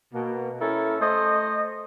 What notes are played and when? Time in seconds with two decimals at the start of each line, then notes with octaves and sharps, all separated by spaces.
0.13 B2 A#3
0.61 C#4 E4 A4 A#4
1.00 A3 C5 D#5